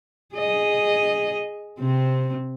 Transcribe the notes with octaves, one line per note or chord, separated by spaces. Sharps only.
G#4 D#5
C3 C4